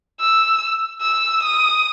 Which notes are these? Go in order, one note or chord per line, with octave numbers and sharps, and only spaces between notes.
E6
E6
D#6